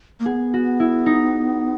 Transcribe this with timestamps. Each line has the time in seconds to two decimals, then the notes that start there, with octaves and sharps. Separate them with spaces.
0.20 A#3
0.26 B3 G#4
0.54 F#4
0.80 E4
1.06 D#4